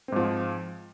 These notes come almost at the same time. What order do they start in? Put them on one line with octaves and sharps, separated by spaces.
C4 G#2 F3